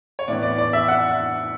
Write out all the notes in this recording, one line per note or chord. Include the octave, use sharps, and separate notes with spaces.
C#5
A2 E3 B3 D5
D5
D5
E5
F#5